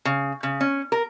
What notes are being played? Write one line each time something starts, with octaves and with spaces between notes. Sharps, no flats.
C#3
C#3
C#4
A#4